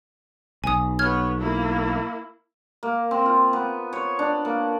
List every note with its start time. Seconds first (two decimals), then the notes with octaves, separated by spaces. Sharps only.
0.64 B1 G#5 D#6
0.99 B3 C#5 F6 G#6
1.38 A#3 E4
2.83 A#3
3.11 C4
3.26 F4
3.53 B3
3.93 C#5
4.19 D4
4.45 A#3